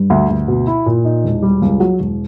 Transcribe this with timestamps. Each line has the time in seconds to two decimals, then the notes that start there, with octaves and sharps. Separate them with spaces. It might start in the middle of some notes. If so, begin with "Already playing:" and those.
Already playing: G2
0.10 D2
0.29 D2
0.48 B2
0.67 E4
0.86 A#2
1.05 D#4
1.24 E1
1.42 G3
1.62 C#2
1.80 F#3
2.00 E1